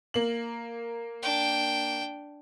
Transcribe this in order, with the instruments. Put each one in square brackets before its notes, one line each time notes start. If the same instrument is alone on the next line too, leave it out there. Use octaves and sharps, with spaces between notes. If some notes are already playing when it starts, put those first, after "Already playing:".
[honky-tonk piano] A#3 F#7
[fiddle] D4 G5